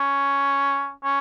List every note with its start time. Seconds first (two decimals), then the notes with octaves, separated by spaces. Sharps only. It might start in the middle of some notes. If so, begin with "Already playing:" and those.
Already playing: C#4
1.04 C#4